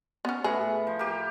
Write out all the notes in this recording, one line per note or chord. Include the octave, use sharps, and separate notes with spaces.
B3 C#4
A2 B3 G#4
F3
A#3 G4